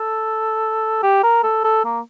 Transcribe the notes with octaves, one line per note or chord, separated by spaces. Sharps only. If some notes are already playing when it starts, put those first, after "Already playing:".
Already playing: A4
G4
A#4
A4
A4
A#3